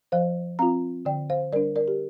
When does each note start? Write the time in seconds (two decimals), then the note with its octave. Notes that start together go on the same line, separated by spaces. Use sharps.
0.12 F3 C5 F5
0.59 C4 F4 F5 A#5
1.05 D3 D5 G5
1.30 C5 F5
1.52 G3 D4 A#4 D5
1.76 A#4 D5
1.88 G4